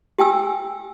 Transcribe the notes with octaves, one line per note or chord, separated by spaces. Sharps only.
G4 G5 G#5 E6